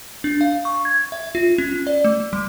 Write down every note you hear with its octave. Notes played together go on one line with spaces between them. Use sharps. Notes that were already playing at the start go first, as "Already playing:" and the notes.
D4
F5
C#6
G#6
E5
F4
C#4
D5
A3
G3